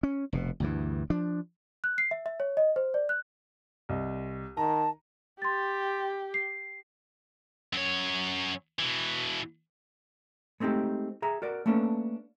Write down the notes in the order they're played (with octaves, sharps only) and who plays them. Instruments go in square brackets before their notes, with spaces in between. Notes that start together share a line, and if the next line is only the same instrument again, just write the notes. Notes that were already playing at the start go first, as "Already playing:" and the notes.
[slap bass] C#4
F1 B2
D2 G2 E3
F3 D4
[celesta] F#6
C7
E5
E5
C#5
D#5
C5
D5
F#6
[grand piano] C2 D#5
[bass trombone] D#3 [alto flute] A5 [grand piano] A#5
[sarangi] G4 [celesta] C6 A6
[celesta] C7
[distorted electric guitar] F#2 C#5
B2 E3
[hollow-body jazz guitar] G#3 A3 C4 D#4 G4
G#4 E5 A#5
F#4 A#4 D5
A3 A#3 C#4 D4 A4 B4